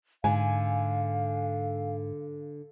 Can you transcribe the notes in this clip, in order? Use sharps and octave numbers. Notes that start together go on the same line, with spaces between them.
G#2 D3 F5 G#5